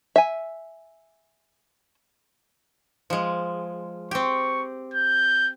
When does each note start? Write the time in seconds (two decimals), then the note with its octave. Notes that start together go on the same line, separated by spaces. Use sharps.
0.16 E5 G#5
3.10 F3 G#3
4.11 C4 G4 C#6
4.94 G6